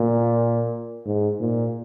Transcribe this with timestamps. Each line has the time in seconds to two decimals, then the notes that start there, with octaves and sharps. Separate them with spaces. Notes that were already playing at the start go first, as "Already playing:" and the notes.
Already playing: A#2
1.06 G#2
1.40 A#2